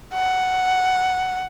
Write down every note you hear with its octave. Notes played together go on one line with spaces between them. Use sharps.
F#5